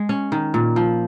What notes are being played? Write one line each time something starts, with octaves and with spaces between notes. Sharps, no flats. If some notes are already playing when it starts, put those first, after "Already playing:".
Already playing: G#3
C#4
D#3
A#2
F3